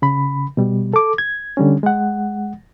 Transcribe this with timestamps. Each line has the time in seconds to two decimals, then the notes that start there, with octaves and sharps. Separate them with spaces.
0.02 C#3 B5
0.57 B2 G3
0.94 A4 D6
1.18 G#6
1.57 D3 G3 C#4
1.83 G#3 F#5